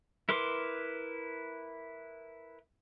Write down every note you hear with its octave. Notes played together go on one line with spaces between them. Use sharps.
E4 A#4 B4 C6 D6